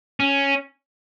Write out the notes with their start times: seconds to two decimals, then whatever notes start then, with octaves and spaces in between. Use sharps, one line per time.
0.20 C#4